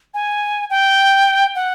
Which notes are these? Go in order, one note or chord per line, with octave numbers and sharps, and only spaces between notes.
G#5
G5
F#5